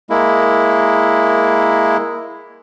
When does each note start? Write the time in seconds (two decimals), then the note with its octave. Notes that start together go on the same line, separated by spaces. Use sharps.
0.10 G#3 A#3 E4